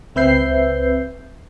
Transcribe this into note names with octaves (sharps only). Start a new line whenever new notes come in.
C#2 C4 B4 E5 G6 C7